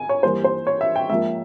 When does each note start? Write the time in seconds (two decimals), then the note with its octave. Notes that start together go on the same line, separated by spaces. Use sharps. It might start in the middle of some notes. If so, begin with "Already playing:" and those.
Already playing: G#5
0.09 C#5
0.23 G2 E3 G3 A#3 C5
0.44 C5
0.67 C#5
0.81 E5
0.96 G5
1.09 G#2 F3 A#3 E5